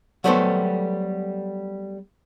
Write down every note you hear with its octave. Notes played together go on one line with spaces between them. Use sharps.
F#3 G3 A3 B3 A4 C5